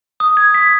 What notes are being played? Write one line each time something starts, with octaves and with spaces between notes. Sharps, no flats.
D#6
G#6
B6